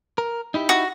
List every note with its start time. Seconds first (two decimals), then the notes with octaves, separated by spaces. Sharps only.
0.18 A#4
0.54 D#4 E4 G4
0.69 F#4